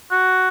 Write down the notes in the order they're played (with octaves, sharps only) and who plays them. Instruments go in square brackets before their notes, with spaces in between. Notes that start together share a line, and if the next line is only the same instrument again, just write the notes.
[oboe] F#4